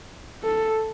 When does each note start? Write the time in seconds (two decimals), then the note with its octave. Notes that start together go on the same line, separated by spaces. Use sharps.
0.43 A4